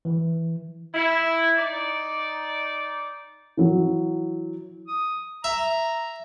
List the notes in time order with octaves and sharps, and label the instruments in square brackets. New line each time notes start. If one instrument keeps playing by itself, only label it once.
[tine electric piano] E3
[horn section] E4
D#4 D5
[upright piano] E3 F#3
[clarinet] D#6
[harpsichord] E5 [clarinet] A#5